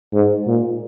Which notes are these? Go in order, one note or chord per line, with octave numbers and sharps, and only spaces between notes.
G#2
A#2